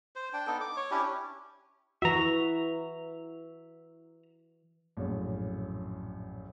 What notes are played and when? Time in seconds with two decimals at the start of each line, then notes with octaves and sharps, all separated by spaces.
0.16 C5
0.33 D4 G5
0.47 B3 D#4 A4
0.61 D6
0.77 C#5
0.91 C#4 D4 E4 G4
2.02 E3 F#4 E5 A#5
4.97 A#1 F#2 A2